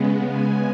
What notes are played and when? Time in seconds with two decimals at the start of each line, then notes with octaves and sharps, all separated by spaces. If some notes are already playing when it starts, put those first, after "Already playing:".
Already playing: C#3 G#3 B3
0.28 G#5